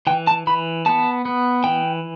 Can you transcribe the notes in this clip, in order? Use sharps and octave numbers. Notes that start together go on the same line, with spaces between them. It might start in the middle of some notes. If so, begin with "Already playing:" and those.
E3 G5
A5
E3 B5
B3 A5
B3
E3 G5